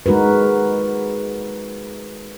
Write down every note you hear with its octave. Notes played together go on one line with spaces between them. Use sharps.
G#3 D#4 F#4 A#4 B4